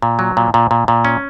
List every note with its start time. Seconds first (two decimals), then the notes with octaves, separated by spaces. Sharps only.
0.02 A#2
0.19 F#3
0.37 A#2
0.54 A#2
0.71 A#2
0.88 A#2
1.05 C#4